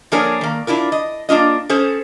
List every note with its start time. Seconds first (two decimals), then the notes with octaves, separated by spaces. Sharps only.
0.12 F3 A#3 D4 G#4 A#4 C#5
0.41 D#3 A#3
0.67 D4 E4 F4 A#4
0.92 D#5
1.29 A#3 D4 F4 D#5
1.69 C#4 G#4 A4 C5